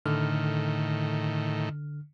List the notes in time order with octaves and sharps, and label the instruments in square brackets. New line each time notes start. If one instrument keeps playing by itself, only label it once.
[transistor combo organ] A2 D#3 [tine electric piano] D3 F6